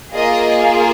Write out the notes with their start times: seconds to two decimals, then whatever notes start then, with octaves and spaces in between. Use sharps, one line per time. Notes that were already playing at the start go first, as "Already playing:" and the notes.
0.14 A#3 F4 G#4 D#5